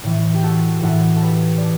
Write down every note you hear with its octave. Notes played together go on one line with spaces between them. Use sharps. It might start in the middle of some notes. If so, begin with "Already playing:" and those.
A2 E3
G4
F#4 A4
A2 E3 F#4 A4
A4
G4 B4
A4 D5